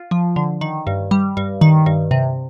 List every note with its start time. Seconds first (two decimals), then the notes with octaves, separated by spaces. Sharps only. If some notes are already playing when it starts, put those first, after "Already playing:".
Already playing: F4
0.11 F3
0.36 D3
0.61 D#3
0.87 G2
1.11 G3
1.37 G2
1.61 D#3
1.86 G2
2.11 C3